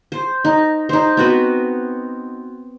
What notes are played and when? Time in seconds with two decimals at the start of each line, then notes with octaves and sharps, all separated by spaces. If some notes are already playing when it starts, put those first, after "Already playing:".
0.12 C5
0.45 D#4
0.89 D#4 C5
1.17 B3 C4 F#4 B4